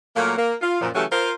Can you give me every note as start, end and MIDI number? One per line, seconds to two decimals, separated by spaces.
0.16 0.37 46
0.16 0.37 54
0.16 0.37 57
0.16 0.37 58
0.37 0.54 58
0.61 0.80 65
0.81 0.89 42
0.81 0.89 46
0.81 0.89 53
0.95 1.04 49
0.95 1.04 52
0.95 1.04 54
0.95 1.04 57
0.95 1.04 61
0.95 1.04 67
1.11 1.32 65
1.11 1.32 70
1.11 1.32 72